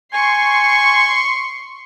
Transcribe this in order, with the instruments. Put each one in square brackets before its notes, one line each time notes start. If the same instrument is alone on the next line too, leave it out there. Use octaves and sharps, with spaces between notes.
[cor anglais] G#5 [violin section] C6 C#6